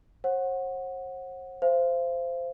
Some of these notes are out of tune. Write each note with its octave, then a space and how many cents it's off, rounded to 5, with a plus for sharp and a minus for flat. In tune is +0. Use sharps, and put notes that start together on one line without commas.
C5 +45 F#5 -10
C5 -10 F5 -35